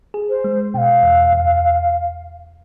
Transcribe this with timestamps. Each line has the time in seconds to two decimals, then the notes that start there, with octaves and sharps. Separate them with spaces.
0.14 G#4
0.29 C5
0.44 G#3
0.74 B2 F5 G5
1.03 E2
1.33 E2